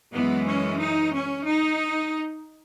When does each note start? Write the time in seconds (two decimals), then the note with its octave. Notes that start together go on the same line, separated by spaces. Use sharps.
0.13 F#2 E3 G#3 B3
0.47 C#4
0.80 D#4
1.14 C#4
1.48 D#4